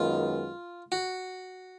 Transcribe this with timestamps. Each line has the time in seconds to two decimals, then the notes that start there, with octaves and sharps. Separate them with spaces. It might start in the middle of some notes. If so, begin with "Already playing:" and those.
Already playing: F#2 D#3 G#3 B3 F4
0.92 F#4